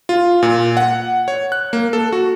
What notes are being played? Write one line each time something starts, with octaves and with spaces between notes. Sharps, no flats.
F4
A#2
F#5
C#5
F#6
A#3
A4
F#4